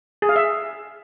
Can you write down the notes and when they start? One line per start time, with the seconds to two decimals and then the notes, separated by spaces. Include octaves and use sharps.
0.22 G#4
0.29 F5
0.36 E5